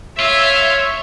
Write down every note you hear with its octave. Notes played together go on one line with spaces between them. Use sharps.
F4 C#5 E5